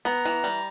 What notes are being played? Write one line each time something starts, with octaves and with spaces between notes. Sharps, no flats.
B3 A#5
E3
G3